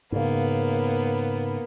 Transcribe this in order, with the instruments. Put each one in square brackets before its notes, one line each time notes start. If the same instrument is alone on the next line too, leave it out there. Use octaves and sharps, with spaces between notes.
[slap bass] G#2 C#3 [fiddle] A#3 B3